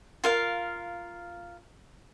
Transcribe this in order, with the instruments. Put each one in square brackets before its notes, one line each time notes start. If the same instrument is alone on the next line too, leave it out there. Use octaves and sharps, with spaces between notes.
[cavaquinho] F4 A#4 F5